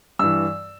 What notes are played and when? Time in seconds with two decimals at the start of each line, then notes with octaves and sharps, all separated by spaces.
0.19 G2 E3 E6